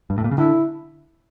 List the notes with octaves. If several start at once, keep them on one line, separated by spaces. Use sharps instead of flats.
G2
A2
A#2
C#3
D3 E4